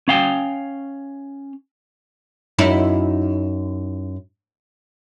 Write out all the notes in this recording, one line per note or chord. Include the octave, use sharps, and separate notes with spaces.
C#4 F5 G5
F#2 D#4 E4